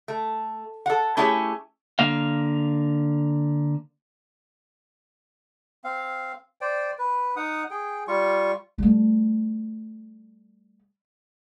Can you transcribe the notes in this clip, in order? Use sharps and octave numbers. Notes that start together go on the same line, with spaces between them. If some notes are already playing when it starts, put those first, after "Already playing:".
A3
A4 F#5
A3 C#4 E4 G4 G#4 C#5
D3 A#3 F5
C4 F5
C5 D5 G5
B4
D#4 F#5 D#6
G#4 G5
G3 F4 C#6
G3 A3